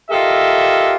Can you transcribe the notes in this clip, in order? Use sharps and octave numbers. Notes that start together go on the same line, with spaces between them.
F4 G4 A4 A#4 D#5 E5